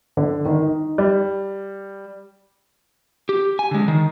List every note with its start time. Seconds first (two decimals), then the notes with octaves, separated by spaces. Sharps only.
0.17 D3
0.45 D#3
0.62 D#4
0.98 G3
3.29 G4
3.59 G#5
3.71 D3 G#3
3.88 D#3